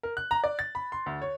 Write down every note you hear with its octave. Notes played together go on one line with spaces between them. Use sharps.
A#4
F#6
A#5
D5
A6
B5
C6
D2
C#5